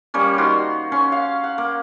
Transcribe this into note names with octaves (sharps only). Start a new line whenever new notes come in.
G3 A#3 C#4
D#3 F#4 C5 C6
C#4 C6 C#6
F5
F#5
A#3